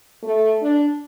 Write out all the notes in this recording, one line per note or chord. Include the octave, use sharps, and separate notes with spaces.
A3
D4